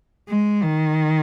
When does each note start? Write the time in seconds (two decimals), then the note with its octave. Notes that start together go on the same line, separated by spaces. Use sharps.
0.28 G#3
0.63 D#3